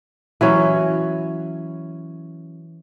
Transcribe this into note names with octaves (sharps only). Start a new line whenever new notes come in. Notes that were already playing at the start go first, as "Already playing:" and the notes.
E3 F#3 C#4